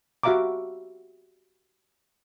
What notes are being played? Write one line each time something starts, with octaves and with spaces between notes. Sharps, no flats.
F#4 G4 E5 F5 A#5 D6